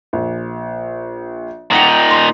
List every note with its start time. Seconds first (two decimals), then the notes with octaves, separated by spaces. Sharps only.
0.13 A#1
1.71 A#2 D#4 F#5 G5 C#7
2.11 C6